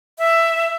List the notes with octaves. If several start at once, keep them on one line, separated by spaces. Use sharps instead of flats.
E5